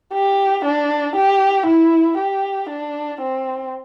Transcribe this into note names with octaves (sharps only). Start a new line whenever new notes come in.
G4
D4
G4
E4
G4
D4
C4